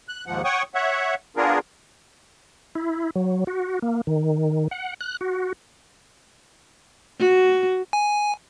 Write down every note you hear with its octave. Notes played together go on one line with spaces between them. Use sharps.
F#6
D#2 G#2 F3 F#5
C#5 F#5 G5 C#6 D#6
C#5 E5 F#5
B3 D4 F4 G#4 A#4
E4
F#3
F#4
A#3
D#3
F#5
F#6
F#4
F#4
G#5